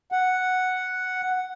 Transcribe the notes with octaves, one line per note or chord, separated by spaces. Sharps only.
F#5